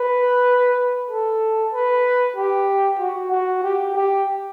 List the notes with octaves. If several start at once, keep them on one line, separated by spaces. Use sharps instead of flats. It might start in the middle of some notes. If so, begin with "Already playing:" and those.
Already playing: B4
A4
B4
G4
F#4
F#4
G4
G4